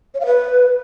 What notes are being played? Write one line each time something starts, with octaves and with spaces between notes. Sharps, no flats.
C#5
F5
B4